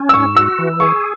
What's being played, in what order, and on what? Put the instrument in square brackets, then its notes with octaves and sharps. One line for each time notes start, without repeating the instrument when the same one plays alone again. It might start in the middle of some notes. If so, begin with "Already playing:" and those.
Already playing: [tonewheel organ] C#4
[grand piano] E6
[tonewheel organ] G#2 [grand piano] C#6
[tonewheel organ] F#4 [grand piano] E6
[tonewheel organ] E3
[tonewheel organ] G#4 [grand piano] C#6